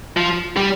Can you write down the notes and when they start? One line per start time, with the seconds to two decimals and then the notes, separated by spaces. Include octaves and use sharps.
0.17 F3
0.57 G3